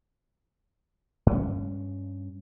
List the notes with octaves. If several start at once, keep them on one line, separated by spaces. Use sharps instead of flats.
G2 C#4